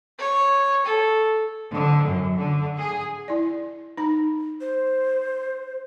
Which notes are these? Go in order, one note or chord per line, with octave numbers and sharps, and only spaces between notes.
C#5
A4
D3
F#2
D3
G#4
E4 D5
D#4 A#5
C5